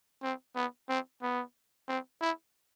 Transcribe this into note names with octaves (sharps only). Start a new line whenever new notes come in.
C4
B3
C4
B3
C4
E4